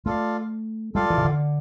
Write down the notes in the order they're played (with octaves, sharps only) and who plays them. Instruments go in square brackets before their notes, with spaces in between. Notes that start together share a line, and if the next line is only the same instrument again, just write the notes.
[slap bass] A3 [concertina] F4 A4 D5 F5
[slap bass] G3 [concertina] F4 A4 D5 F5
[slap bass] E3
C3
D3